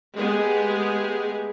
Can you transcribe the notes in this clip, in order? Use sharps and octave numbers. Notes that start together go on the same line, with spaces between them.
G#3 A3 B3 G4 G#4